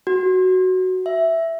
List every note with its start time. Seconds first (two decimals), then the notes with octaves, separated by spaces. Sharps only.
0.07 F#4
1.06 E5